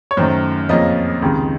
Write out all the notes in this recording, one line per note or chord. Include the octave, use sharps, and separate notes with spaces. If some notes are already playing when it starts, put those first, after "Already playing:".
C#5
F#2 D#3 F#3 A3 C5
F2 C#3 F3 A#3 C#4 D#5
C#2 C3 D#3